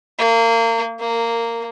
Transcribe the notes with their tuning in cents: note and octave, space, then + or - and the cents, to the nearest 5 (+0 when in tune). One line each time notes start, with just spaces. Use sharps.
A#3 -30
A#3 -15